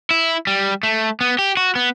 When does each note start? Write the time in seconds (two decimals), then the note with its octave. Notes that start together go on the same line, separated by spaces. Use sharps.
0.11 E4
0.47 G3
0.83 A3
1.21 B3
1.39 G4
1.57 F#4
1.75 B3